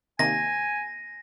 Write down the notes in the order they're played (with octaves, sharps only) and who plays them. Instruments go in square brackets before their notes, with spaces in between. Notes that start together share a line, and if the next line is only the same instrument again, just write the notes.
[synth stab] C3 D#3 A#3 [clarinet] G#5 [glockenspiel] A#6